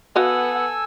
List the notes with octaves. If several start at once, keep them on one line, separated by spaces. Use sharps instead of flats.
B3 F#4 A4 D#5 F5 F#5 G#5 E6